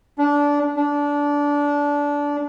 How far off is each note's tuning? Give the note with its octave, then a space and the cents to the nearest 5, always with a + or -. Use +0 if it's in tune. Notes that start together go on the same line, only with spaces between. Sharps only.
D4 -20
D4 -20